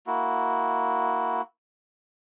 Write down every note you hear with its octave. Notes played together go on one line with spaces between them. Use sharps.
A#3 E4 F#4